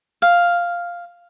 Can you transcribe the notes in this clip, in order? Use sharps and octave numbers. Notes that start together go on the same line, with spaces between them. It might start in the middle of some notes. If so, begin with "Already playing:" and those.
F5